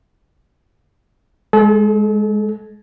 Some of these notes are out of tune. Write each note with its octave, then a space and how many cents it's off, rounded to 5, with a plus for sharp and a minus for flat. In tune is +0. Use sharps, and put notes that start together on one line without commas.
G#3 +0 A4 -40